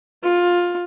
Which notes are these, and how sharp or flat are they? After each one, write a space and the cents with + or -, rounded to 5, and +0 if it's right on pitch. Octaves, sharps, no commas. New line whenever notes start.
F4 +15